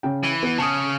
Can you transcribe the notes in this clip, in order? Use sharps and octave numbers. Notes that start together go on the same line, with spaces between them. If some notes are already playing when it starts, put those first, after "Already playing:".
C#3 G5
E3
B3
C#3 A5 D#6